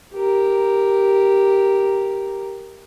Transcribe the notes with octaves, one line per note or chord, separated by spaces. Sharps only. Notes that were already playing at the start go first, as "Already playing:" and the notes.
G4 A#4